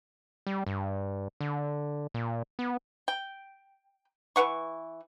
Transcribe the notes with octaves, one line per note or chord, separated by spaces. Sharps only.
G3
G2
D3
A#2
B3
G5
E3 B4 F#5 C#6